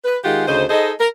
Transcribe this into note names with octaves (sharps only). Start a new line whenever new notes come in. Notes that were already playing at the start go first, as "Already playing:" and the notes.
B4
D#3 G#3 F4 G4 G#4 F#5
D2 C#3 D#4 C5
D#4 G#4 A4 C5 D#5
A#4